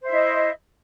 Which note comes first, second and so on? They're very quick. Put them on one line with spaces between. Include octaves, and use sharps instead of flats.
C5 E5 E4 D#5